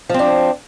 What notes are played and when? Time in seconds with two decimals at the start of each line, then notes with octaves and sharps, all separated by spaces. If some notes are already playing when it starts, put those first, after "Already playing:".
0.09 F3
0.14 C4
0.19 D4